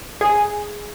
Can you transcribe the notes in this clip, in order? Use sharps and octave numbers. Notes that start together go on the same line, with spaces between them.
G#4